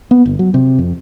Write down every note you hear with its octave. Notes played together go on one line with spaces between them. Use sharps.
B3
G1
F#3
C3
F2